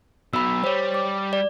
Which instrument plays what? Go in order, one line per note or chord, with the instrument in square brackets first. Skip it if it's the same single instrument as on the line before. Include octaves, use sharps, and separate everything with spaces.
[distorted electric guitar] F#3 B3 [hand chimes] B5 E6
[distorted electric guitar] G3 [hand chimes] C5 C#5
[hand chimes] D6
D5